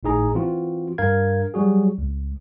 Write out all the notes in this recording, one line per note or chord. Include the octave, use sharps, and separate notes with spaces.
G#1 A2 D#4 G#4 A#5
E3 C4 F4 F#4
G2 D4 A#4 F5 G#6
F#3 G3 F#4 G#4
C#2